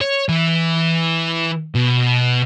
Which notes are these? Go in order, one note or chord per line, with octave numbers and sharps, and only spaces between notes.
C#5
E3
B2